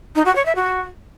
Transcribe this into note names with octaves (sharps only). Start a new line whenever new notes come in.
D#4
F#4
C#5
E5
F#4